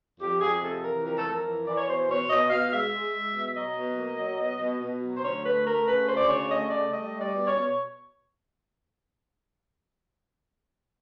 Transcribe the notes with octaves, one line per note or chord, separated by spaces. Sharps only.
F2 G4
F2 G#4
C3 A4
E3 A#4
F2 A#4
A4
F2 A#4
E3
E3 D5
C#5
B2 C5
B2 C#5
B2 D#5
B2 F5
G#3 E5
G#3
G#3
B2
F#3 D#5
B2
A#3
F#3
B2
B2
B2
F#3
C5
D2 C#5
A3 B4
A3 A#4
C#3 B4
D2 C5
D5
C#3 C#5
A3 D#5
A3 D5
G3 D#5
G3
D5
B2
C#5
B2